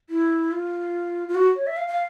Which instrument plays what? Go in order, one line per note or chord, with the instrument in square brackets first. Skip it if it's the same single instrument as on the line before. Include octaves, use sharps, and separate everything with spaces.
[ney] E4
F4
F4
F#4
C#5
E5
F5
F5